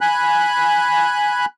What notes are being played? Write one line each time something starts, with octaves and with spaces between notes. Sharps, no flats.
G#5 B5 F#6